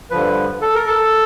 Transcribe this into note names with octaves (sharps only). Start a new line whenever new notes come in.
G2 D3 F3 B4
A4
A#4
A4